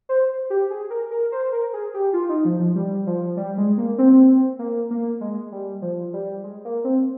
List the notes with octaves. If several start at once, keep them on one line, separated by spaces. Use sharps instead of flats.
C5
G4
G#4
A#4
A#4
C5
A#4
G#4
G4
F4
D#4
F3
F3
G3
F3
G3
G#3
A#3
C4
A#3
A#3
G#3
G3
F3
G3
G#3
A#3
C4